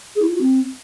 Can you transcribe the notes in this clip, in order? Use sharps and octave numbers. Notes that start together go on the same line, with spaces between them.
G#4
E4
F4
F#4
C4